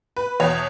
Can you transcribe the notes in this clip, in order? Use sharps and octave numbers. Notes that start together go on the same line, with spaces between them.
B4
E2 B2 C#5